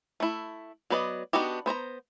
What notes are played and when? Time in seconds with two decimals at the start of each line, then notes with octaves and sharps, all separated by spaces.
0.20 A3 E4
0.90 F#3 B3 B4 D5 D#5
1.33 B3 D4 D#4 F#4 G4
1.66 B3 C5 C#5 A#5